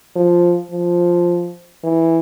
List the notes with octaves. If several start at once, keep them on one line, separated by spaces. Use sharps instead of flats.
F3
F3
E3